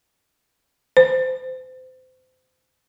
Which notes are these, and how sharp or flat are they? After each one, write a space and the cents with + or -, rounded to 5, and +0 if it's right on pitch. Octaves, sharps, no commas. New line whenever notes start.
C5 -30